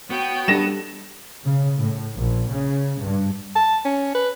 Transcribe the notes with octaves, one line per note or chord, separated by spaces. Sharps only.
B3 F#4 C#5 G5
G3 D4 A4 A#6 E7
C#3
A2
A#1
C#3
G2
A5
C#4
B4